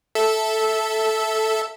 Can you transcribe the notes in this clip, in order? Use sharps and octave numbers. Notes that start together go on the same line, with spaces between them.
A4 E5